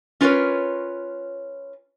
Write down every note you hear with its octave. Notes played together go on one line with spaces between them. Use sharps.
C#4 F4 A#4 B4 C#5